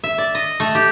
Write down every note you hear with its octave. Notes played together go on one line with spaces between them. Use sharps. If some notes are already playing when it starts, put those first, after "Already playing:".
E5
D5
D#5
A3
G4